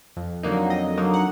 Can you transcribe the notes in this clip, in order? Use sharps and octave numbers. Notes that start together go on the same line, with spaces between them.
F2
D3 F#3 A#3 D#4
F2 D#5
D3 F#3 A#3 D#4
F#5